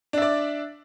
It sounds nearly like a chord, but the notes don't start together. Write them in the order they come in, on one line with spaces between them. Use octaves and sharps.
D4 E5 D5